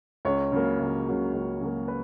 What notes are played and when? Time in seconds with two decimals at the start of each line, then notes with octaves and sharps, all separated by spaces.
0.25 C#2 C#5
0.52 C#3 F#3 A#3
0.80 C#2
1.07 C#3 F#3 A#3
1.33 C#2
1.61 C#3 F#3 A#3
1.88 B4